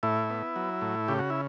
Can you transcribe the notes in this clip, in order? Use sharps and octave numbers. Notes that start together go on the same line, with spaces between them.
A2 E4
B3
F#3
A2
C#3 G4
F#4
E4